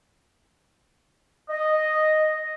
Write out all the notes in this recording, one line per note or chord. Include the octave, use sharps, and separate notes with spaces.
D#5